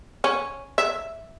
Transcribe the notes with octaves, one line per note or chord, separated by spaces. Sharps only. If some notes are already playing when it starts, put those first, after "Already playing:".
C#4
E5